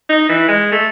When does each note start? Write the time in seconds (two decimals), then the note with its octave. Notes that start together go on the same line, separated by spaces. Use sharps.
0.09 D#4
0.29 E3
0.48 G#3
0.72 A3